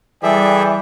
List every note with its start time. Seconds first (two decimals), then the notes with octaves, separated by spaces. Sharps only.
0.23 E3 G3 G#4 A4 D5 E5 G5